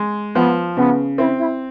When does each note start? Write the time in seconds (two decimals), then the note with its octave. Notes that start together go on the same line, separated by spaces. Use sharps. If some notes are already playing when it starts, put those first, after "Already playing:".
Already playing: G#3
0.35 F3 B3
0.77 C#3 B3
1.18 C4 E4
1.39 E4